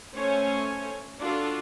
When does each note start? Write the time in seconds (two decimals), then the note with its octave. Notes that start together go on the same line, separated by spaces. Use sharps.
0.17 A3 C#4 C5 C#5 G#5
1.20 D4 F4 F#4 A4